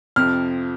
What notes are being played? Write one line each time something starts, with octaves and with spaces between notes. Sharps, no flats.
F2 C3 F3 F6